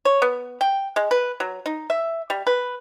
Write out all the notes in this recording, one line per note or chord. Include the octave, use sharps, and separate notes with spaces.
C#5
B3
G5
G#3
B4
F#3
D#4
E5
G3
B4